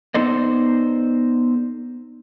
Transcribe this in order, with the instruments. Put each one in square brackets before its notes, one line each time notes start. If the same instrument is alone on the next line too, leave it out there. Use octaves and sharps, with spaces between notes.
[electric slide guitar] B3 D#4 A4 C5 D5 D#5